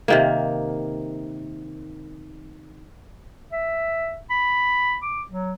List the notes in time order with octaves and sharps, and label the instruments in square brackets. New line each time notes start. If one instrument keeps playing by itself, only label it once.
[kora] C3 D#3 A#3
[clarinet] E5
B5
D6
F#3